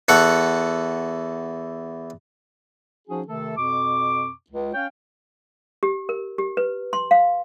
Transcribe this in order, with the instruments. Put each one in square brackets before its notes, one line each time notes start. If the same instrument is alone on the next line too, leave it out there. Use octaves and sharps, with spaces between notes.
[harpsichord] E2 A4 F#5 C#6
[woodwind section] F3 C#4 D#4 F#4 G#4
C3 D#3 A3 A4
F2 B2 C#6 D6
C#2
C#4 C#5 F5 G5
[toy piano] G4
A#4
G4
B4
C6
F5